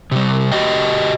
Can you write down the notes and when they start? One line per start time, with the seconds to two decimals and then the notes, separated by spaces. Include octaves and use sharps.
0.11 C3 G3
0.52 F#4 G4 D#5 G5